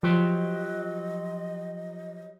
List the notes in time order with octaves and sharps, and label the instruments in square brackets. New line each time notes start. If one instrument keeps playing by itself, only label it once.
[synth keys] F3 [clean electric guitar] F#3 G4 C5 [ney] D#5